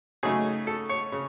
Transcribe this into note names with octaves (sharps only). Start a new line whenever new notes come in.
C#3 F#3 A3 D#4 G#4
A4
C#5
C#3